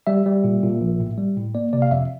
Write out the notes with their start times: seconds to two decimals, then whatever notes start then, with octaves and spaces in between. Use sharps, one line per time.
0.07 G3 E5
0.26 G3
0.44 A#2
0.63 A#2
0.81 A#1
1.00 A2
1.18 G3
1.37 A2
1.55 A#3 D5
1.73 C3 D5
1.82 F5
1.91 F2 E5